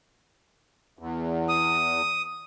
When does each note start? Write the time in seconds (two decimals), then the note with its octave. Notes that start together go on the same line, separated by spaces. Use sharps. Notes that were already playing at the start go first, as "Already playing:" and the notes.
0.99 E2
1.49 D#6